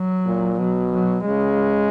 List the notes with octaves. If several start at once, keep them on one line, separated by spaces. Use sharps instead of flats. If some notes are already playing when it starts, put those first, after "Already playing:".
Already playing: F#3
A#2
B2 F#3
F#3
C#3 G#3